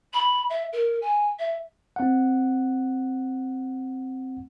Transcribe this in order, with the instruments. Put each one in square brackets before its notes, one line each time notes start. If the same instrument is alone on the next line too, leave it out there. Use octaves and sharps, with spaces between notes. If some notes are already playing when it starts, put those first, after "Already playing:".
[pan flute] B5
E5
A#4
G#5
E5
[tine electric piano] C4 F#5